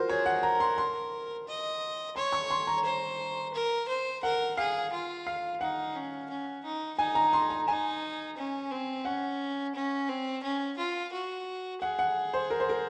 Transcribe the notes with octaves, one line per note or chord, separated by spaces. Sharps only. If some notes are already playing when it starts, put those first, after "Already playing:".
Already playing: F4 F#4 A#4 C5
G#4 C#5
F#5
A#4 A#5
C6
C6
D#5
C#5 C6
C#6
C6
A#5
C5
A#4
C5
A#4 F#5
G#4 F5
F4
F5
D#4 F#5
C#4
C#4
D#4
D#4 G#5
A#5
C6
A#5
D#4 G#5
C#4
C4
C#4 F#5
C#4
C4
C#4
F4
F#4
G#4 F#5
F#5
C5
A#4
C5
A#4